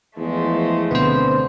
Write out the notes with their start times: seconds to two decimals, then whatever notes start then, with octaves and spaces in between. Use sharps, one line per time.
0.17 E2 F3 G#3 A3
0.91 D2 B2 D3 B3 C4 C5